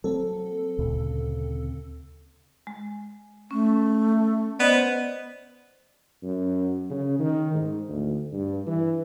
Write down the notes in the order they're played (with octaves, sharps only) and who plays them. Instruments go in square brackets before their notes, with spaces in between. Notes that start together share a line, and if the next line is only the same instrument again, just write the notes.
[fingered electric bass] F#3 A#3 [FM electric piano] C4 A4
[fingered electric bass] D2 A#2 C#3
[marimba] G#3
[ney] A3 [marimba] C#4
[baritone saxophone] B3 [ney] C5 [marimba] D5 D#5 B5
[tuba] F#2
C#3
D#3
G#2
D2
G2
E3